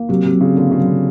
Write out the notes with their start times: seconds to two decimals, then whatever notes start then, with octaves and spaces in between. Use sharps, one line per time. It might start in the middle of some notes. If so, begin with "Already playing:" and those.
Already playing: A#3
0.09 C3 F#3
0.24 C3
0.33 F#3
0.41 C#3
0.56 D3 A#3
0.71 C#3
0.80 F#3
0.88 C3